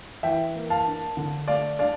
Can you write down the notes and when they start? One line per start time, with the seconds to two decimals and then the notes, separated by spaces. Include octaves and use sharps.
0.23 E3 E5 G5
0.55 A#3
0.70 F5 A5
0.86 D4
1.17 D3
1.48 A3 D5 F5
1.79 D4 D5 F5